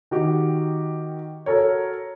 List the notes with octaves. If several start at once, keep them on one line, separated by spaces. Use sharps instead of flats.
D#3 F#4 G4
F#4 A4 A#4 C#5